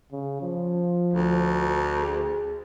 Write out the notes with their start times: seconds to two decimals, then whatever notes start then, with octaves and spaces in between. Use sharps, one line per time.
0.12 C#3
0.42 F3
1.13 D2
2.00 G#4